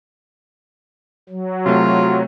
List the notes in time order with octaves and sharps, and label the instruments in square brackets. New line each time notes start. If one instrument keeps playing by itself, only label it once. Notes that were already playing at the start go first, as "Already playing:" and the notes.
[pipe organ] F#3
[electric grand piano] C3 A3 [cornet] F4